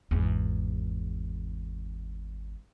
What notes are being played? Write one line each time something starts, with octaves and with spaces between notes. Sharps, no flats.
G#1 E2